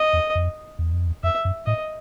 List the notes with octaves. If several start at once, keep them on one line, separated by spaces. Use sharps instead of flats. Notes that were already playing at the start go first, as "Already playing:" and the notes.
Already playing: D#5
E2
F2
E2
F2
E2
F2 E5
F#2
A2 D#5